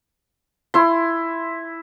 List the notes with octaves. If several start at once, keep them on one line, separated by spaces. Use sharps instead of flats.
E4 C6